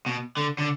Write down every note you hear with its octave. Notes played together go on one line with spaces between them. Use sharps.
B2
D3
D3